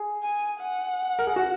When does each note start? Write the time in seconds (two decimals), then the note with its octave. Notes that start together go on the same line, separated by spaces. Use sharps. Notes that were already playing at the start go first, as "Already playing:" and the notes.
Already playing: G#4
0.23 G#5
0.61 F#5
1.19 A#4
1.27 G#4
1.36 F#4